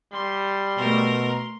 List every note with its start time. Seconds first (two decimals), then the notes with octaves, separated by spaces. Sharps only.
0.13 G3 C6
0.78 B2 A3 A#4